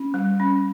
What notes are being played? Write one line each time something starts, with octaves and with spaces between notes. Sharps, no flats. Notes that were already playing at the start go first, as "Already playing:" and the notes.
Already playing: C#4
G3
C#4